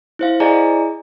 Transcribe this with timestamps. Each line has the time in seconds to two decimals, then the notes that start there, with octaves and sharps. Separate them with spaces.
0.19 E4 C5 F5
0.40 E4 G#4 D5 D#5 G#5 A#5